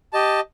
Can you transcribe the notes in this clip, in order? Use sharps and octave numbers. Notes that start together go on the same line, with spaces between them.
G4 D#5 A5